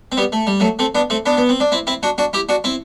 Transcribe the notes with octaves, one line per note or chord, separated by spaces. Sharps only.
C4
G3 B3
A3
G3
F#3 A3
A3 C4
B3 D4
A3 C4
B3 D4
B3
C4
D4
C4 E4
C4 E4
D4 F#4
D4 F#4
E4 G4
D4 F#4
C4 E4